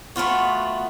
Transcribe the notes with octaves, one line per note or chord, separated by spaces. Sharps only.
A3 B3 F4 F#4